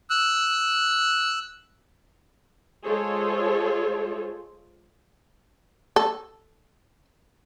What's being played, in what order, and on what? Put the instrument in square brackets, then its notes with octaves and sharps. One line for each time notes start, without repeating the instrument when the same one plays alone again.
[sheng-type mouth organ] E6 F#6
[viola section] G#3 F4 G#4 A4 C5 C#5
[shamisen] A4